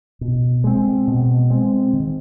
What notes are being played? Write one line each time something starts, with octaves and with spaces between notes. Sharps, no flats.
B2
G#3 C4
B2
G#3 C4
D#3